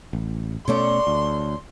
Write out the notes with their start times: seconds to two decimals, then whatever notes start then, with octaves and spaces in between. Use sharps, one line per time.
0.13 A1
0.68 B2 A3 C#4 A4 C#5 D5 C6
1.07 D2